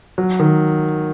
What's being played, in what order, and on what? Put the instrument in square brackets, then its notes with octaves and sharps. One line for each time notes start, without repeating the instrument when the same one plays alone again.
[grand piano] F#3
D#3